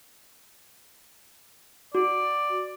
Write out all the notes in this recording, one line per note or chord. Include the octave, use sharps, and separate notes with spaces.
F#4 D5